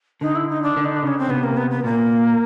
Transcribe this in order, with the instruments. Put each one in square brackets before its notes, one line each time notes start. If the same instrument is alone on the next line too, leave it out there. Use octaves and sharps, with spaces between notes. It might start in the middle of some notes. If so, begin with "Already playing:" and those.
[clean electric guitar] D3 [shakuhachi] D#4
[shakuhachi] E4
D#4
D4
[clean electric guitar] D3
[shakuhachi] D#4
D4
[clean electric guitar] C#3 [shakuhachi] C#4
[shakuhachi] C4
[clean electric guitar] C3 [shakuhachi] B3
[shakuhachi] A#3
B3
B3
[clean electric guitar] A#2 [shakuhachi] A#3